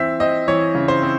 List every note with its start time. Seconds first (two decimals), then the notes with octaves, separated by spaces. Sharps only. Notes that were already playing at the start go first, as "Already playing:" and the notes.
Already playing: E3 C4 E5
0.20 C4 D#5
0.48 E3 C#5
0.75 C#3
0.88 C5
1.02 C4